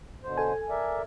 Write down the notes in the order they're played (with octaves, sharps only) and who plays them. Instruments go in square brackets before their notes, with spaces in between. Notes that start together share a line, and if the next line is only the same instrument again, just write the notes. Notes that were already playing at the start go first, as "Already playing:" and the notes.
[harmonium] B2 D3 C5
[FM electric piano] A4 G#5
[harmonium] A#4 D5 E5